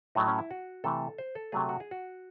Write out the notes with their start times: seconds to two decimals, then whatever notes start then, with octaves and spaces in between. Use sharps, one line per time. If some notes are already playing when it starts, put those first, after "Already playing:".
0.15 A2 F#3 A3 D#4
0.28 C#4
0.38 E4
0.51 F#4
0.84 C3 E3 A3 A4
1.18 C5
1.35 A4
1.52 C3 F#3 A3 G#4
1.69 F#4
1.80 G#4
1.91 F#4